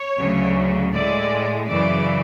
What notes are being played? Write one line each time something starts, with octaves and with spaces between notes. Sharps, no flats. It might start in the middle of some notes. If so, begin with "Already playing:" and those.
Already playing: C#5
D2 C#3 F#3
A2 G#3 D5
F#2 C#3 E3 D5